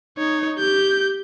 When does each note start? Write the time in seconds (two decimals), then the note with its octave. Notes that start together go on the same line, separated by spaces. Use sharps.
0.17 D#4 C#5
0.58 G4 G6